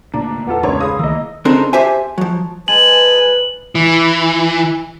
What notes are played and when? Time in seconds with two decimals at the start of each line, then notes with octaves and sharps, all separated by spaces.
0.14 D2 A#2 A#3 D4 A#5
0.47 A1 E2 B3 F4 A4 F#5
0.63 C#2 C#3 D4 A#4 C#5 C6
0.80 G#4 F5 B5 D#6
0.99 D#3 E3 A3 A#3 D#5 E6
1.45 C#3 C4 D4 D#4 A4 A#4
1.73 G4 C5 E5 G#5
2.18 F3 F#3
2.68 G#3 B4 G#5 A5 F#7
3.75 E3